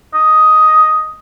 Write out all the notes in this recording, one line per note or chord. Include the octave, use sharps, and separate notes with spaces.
D#5